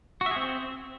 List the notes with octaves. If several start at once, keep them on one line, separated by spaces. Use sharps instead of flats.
F#4
E5
G#4
C4